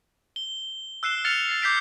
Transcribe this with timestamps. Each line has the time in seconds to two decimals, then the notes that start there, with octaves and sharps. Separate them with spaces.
0.36 G7
1.03 E6 F#6 C7 E7 G7
1.25 F6 A6 C#7 F7
1.48 A6 C7
1.62 D6 G6 A6 B6 C7 D7